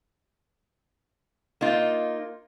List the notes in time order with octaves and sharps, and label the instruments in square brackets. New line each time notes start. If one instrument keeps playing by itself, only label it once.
[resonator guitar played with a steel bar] A#3 D#4 F4